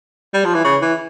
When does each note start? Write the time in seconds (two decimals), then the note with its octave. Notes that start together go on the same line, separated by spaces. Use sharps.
0.34 G3
0.45 F3
0.54 E3
0.64 C#3
0.82 E3